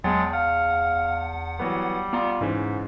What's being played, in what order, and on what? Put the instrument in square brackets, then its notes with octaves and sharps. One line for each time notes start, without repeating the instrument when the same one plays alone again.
[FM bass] E2 [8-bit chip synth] F#3 F#5 A6 [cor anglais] G#3 [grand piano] G5 A5
[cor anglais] F5 [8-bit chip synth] F#5
[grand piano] E3 F#3 B3 [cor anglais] G3
[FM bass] B3 [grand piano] F4 D5 A#5
[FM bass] G#2 [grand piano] C#3 E3 G#3